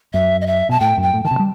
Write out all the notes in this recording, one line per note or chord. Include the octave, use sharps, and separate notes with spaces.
F#2 E5
D#5
E5
B2 A5
A2 G5
F#2
G5
A2
D#3 A5
C3
G3